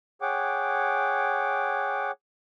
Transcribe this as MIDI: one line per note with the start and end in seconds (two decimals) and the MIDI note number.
0.22 2.12 68
0.22 2.12 73
0.22 2.12 78
0.22 2.12 79
0.22 2.12 86